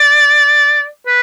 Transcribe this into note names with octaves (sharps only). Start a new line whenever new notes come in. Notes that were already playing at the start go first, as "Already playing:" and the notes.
Already playing: D5
B4